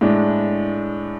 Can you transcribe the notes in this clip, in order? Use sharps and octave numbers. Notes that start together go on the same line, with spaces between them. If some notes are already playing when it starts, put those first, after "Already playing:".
A2 G#3 D4